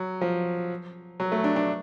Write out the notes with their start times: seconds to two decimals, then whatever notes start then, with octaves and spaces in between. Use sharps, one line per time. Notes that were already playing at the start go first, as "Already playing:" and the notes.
Already playing: F#3
0.21 F3
1.20 F#3
1.32 A3
1.44 D4
1.56 D4